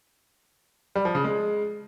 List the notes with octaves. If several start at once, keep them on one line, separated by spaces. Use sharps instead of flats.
G3
F3
C#3
G#3